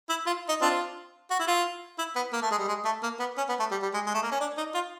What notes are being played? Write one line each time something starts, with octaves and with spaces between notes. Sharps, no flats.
E4
F4
D#4
C4 D4 F4
F#4
E4
F4
E4
B3
A#3
A3
G#3
G3
G#3
A3
A#3
B3
C#4
B3
A3
G3
G3
G#3
G#3
A3
A#3
C#4
D4
D#4
F4